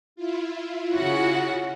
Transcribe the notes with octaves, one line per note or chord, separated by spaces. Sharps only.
E4 F4
C#3 F#4 F#5